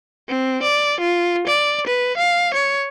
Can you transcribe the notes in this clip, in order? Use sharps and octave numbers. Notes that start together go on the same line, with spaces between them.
C4
D5
F4
D5
B4
F5
C#5